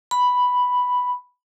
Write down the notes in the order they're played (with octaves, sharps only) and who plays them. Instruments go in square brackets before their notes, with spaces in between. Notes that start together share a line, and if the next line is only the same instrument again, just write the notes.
[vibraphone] B5